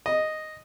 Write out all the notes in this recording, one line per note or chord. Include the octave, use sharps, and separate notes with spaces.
D#5